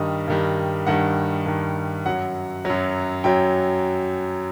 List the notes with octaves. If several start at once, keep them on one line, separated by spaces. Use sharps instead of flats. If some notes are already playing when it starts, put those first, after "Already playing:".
Already playing: G2 D#3 G3 D#5
G2 D#3 G3
G2 D#3 G3 F#5
G2 D#3 G3
F#2 F#3 F#5
F#2 F#3
F#2 F#3 G5